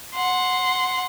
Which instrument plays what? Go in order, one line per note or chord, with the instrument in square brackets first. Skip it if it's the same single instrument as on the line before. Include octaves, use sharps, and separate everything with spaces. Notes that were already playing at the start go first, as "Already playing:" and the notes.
[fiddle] F#5 C6